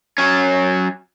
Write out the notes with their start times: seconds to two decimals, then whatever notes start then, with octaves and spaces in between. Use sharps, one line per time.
0.18 F#3 C#4